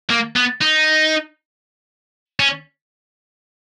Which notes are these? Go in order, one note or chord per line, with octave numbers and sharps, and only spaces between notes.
A#3
B3
D#4
C#4